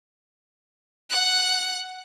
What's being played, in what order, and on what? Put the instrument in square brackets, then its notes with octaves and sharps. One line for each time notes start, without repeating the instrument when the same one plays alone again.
[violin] F#5 F#6